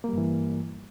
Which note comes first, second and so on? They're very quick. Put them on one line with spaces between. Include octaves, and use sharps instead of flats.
A#3 G3 G2 E3